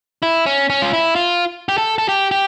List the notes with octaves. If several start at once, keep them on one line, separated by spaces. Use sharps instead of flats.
E4
C#4
C#4
F4
E4
F4
G4
A4
A4
G4
G4